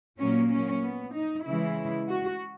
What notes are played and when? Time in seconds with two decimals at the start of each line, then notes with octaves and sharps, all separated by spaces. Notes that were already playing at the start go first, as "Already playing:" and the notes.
0.19 A#2 F#3 A#3 C#4
0.51 C#4
0.82 B3
1.14 D#4
1.46 C#3 E3 G#3 E4
2.08 F#4